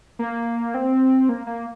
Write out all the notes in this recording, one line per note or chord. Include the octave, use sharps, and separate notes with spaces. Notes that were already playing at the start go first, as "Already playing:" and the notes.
A#3
C4
A#3
A#3